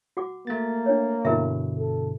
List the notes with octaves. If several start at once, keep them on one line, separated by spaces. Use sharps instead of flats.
F#4 F#5 D6
A3 A#3 A6
D4 C#5
G2 B2 D3 E4 A#4 E5
A4